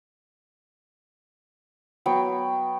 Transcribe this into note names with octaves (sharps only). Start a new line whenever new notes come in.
F#3 B3 G5 C#6